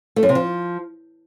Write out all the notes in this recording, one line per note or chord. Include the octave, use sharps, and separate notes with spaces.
A3
F#2
C3
F3